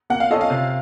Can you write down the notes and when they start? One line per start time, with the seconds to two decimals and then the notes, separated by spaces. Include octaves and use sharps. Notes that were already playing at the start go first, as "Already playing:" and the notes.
0.10 A#3 F#5
0.20 F5
0.30 C#4 F4 A4 D#5
0.41 F5
0.50 C3